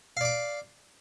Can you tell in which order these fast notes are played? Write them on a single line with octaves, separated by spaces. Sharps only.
F5 D5 D6